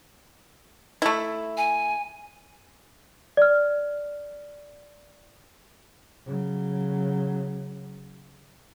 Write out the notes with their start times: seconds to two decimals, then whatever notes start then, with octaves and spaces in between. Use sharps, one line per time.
1.02 A3 E4
1.57 G#5
3.37 D5 F6
6.26 C#3 F#3